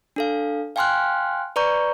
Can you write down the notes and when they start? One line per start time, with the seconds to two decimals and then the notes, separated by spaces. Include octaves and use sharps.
0.16 D4 A4 F5
0.76 F5 G5 G#5 C6 F6 F#6
1.56 B4 D5 A#5 C#6 G6